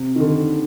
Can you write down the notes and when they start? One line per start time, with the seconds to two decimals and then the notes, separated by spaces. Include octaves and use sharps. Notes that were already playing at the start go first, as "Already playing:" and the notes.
Already playing: C3
0.16 D#3
0.20 D3